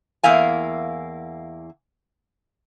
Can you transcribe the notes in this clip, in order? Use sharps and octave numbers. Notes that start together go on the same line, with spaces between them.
E2 A#3 E4 F5 G#5